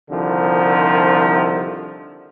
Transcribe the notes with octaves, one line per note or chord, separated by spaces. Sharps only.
C2 D3 D#3 F3